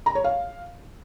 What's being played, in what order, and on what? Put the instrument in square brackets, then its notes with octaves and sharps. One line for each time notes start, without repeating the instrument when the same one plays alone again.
[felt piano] A#5
C#5
F5